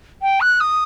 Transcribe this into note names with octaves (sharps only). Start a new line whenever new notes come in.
G5
F#6
D#6